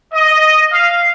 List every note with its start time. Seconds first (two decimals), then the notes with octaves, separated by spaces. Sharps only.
0.14 D#5
0.73 F5